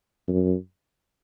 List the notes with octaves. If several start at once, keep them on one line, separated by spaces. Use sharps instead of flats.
F#2